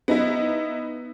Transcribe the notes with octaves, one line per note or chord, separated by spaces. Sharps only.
B3 D#4 E4